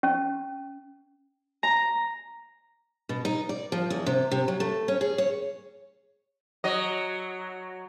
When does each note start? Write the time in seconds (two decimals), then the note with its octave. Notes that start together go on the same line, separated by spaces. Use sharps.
0.03 C#4
1.63 A#5
3.09 B2
3.25 D#4
3.49 D5
3.72 F3
3.90 E2
4.06 C3
4.31 C3
4.48 F#3
4.60 A3
4.88 C#4
5.01 G#4
5.18 C#5
6.64 F#3 D#5